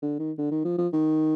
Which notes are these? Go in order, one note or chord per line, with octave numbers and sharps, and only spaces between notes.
D3
D#3
D3
D#3
F3
F3
D#3